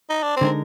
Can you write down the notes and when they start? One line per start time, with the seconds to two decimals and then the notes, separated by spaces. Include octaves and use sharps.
0.10 D#4
0.23 D4
0.36 C4
0.41 D3 G#3 D#4 A#4